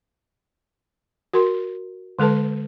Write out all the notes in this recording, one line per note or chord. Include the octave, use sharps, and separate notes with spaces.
F#4 A#4 C6
D3 G#3 A4 B4 A5